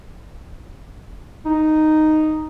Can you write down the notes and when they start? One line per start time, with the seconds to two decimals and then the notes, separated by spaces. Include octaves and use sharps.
1.46 D#4